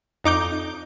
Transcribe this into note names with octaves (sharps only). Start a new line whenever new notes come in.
F2 D#4 D6 G6